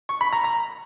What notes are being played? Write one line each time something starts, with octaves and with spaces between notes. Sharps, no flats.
C#6
B5
A#5
A#5